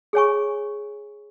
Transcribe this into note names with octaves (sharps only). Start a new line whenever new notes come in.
G#4 C#5 G#5 C#6